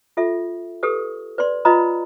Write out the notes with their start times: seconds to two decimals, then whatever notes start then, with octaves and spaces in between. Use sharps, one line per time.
0.17 F4 A4 E5
0.83 G4 A4 B4 D#6
1.38 B4 D5 C6
1.65 F4 B4 D#5 A#5 B5 D#6